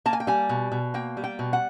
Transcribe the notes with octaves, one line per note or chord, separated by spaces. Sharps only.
A#3 A5
G#5
G5
G3 G#5
B2
B2
A#3 G5
G3
G5
B2
F#5